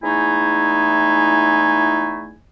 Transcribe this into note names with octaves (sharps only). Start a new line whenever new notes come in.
E2 G#3 A3 D#4 E4 G#5